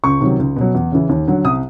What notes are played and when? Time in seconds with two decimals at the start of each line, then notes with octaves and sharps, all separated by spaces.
0.04 C#2 C#6
0.21 C3 D#3 F#3
0.39 C#2
0.56 B2 F#3
0.75 E2
0.92 C#3 E3
1.09 D#2
1.27 D3 F#3
1.45 C2 D#6